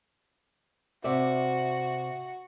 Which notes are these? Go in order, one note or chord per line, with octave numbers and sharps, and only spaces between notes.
C3 F#4 D5 E5